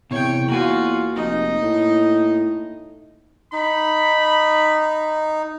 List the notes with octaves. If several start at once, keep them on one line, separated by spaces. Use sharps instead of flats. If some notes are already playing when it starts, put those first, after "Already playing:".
E2 C3 C#5 G5
A#3 F4 F#4 G#5
F1 D#4 D#5
A2
D#4 B5